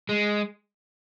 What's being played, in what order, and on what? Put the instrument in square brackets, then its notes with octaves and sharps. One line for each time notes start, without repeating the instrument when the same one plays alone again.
[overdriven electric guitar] G#3